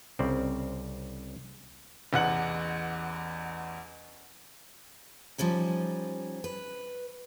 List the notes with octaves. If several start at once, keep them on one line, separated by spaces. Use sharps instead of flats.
C2 C#3 C4 C5 D5
A1 E2 F#5 F#7
F3 G3 C#4 D#4
B4